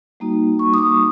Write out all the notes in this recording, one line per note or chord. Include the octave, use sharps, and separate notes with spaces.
G3 A#3 D#4 F#4
C#6
D#6
D6